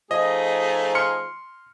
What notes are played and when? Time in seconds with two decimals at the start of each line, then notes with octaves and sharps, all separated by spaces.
0.11 F3 A3 D#4 G#4 D#5
0.95 C6 F6 C#7